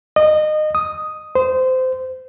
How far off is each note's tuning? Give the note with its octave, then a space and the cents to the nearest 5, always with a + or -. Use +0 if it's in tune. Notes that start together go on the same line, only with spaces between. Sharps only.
D#5 -25
D#6 +5
C5 -20